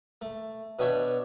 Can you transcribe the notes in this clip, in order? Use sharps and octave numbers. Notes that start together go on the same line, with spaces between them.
A3
B2 B3 D4 C#5 E5 G5